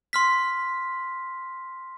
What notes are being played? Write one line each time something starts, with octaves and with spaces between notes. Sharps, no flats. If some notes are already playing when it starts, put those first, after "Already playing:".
C6 F6 B6